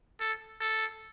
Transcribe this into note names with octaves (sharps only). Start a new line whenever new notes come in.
A4
A4